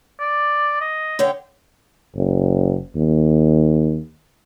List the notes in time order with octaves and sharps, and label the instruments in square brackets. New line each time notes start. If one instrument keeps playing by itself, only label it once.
[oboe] D5
D#5
[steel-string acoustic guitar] D3 C#5 G5
[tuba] F#1
D#2